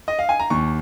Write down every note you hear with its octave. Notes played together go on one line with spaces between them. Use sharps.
D#5
F5
G#5
A#5
D#2 C#6